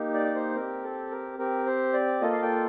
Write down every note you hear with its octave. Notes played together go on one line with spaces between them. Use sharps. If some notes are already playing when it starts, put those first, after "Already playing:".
Already playing: A#3 D#4 G4
D5
C5
C4 G4 A#4
A4
A#4
C4 G4 A#4
C5
D5
A#3 F4 A4 D#5
F5
G5